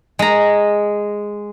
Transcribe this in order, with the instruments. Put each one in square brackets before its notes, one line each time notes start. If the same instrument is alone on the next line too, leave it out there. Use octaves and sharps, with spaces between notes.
[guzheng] G#3 A#5